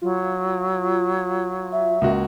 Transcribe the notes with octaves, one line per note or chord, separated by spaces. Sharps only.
F#3 F4
E5
C#2 A#3 F#4